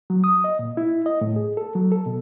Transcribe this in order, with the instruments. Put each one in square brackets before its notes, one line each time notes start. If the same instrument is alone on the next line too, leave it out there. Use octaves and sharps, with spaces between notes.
[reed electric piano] F#3
D#6
D#5
A#2
E4
D#5
A2
G#4
A4
F#3
A4
B2